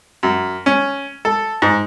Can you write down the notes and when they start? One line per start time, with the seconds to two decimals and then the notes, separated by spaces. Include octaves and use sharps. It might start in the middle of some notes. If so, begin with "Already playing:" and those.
0.23 F#2
0.66 C#4
1.25 A4
1.62 G#2